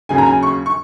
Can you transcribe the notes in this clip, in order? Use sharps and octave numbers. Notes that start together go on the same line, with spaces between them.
D#2 C#3 F#3 G#5
A#5
G#5
C#6
C#6